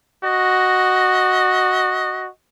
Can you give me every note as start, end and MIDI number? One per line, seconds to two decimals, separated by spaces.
0.24 2.29 66
0.24 2.29 75